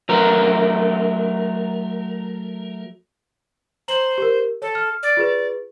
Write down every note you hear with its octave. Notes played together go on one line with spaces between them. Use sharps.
F#3 A3 A#4
C5 A#5 F#7
G4 A#4
A4 C#5
F6
D5
F4 G#4 B4